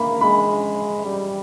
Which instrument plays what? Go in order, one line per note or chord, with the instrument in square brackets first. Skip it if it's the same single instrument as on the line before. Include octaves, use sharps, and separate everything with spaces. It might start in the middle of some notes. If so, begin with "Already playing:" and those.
Already playing: [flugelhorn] A#3 [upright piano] B5
[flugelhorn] G#3 [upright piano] B5
[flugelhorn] G3